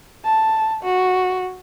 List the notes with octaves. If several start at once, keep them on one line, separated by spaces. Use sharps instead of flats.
A5
F#4